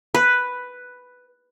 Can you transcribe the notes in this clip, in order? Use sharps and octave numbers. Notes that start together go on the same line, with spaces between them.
B4